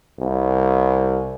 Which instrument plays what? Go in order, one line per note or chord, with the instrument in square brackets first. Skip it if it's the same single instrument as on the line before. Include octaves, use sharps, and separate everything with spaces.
[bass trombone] C2